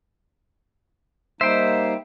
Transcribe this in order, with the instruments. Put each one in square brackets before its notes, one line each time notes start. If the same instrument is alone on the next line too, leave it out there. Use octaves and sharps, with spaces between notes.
[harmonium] G3 A#3 D#4 [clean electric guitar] C5 [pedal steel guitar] E5 G5